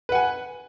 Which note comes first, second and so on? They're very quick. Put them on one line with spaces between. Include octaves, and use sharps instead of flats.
B4 F#5 G#5